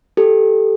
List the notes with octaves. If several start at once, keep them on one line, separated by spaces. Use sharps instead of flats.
G4 A4